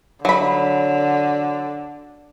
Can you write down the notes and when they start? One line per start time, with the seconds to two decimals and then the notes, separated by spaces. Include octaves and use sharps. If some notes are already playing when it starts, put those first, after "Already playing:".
0.25 D3 F#3 B5